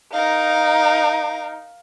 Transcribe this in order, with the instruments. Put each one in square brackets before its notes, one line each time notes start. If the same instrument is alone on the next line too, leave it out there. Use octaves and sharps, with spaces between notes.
[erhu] D#4 [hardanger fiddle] A#4 F5